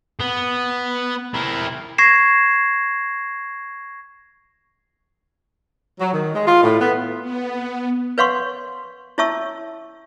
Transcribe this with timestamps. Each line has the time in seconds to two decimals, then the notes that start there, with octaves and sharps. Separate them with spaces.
0.20 B3
1.34 E4 A#4
1.98 C#6 G#6 A#6 C7 E7
6.00 F#3
6.14 D#3
6.35 G#3
6.47 F4
6.63 A2
6.80 B3
7.21 B3
8.18 B4 C#5 F5 F#5 C6 C#6
9.18 E4 C#5 E5 A5 C#6 E6